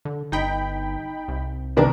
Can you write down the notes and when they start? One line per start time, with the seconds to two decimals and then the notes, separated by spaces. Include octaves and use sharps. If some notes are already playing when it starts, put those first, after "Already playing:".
0.05 D3
0.32 G1 D#4 G5 B5
1.28 C2
1.77 C3 D#3 G3 B3 D4 A#4